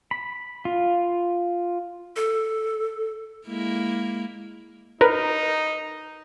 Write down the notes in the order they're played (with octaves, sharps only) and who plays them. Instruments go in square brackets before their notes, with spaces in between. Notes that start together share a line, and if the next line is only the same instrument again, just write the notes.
[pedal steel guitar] B5
F4
[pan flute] A4
[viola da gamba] G#3 A#3 E4
[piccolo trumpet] D#4 [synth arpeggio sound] A#4 B4